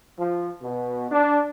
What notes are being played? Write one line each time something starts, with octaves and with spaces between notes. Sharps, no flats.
F3
B2
D4